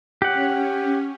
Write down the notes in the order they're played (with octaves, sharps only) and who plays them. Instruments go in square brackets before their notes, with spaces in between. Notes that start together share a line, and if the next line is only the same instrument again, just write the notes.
[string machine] C#4 [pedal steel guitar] G4 F#5